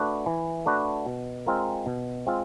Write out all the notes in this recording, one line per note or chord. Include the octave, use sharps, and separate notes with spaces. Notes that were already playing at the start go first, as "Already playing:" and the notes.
Already playing: A3 D4 F#4 B4
E3
A3 D4 F#4 B4
B2
G#3 C4 F4 A#4
B2
G#3 C4 F4